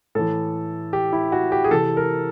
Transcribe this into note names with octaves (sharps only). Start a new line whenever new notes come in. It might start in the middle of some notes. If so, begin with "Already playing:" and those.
A2 E3 A4
G4
E4
F#4
G4
G#4
C3 E3 A4
A#4